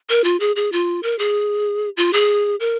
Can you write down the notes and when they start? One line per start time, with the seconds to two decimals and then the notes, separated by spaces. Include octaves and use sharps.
0.09 A#4
0.24 F4
0.40 G#4
0.56 G#4
0.72 F4
1.03 A#4
1.19 G#4
1.97 F4
2.13 G#4
2.60 A#4